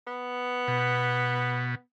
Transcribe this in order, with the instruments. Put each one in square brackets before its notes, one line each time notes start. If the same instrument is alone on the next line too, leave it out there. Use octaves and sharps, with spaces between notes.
[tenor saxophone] B3
[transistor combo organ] B2